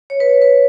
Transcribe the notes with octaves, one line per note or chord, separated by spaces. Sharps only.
C#5
B4
C#5
B4